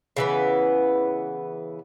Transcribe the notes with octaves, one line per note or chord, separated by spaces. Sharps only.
C#3 E3 B3